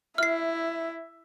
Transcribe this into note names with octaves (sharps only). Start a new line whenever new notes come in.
E4 E5 F6 C7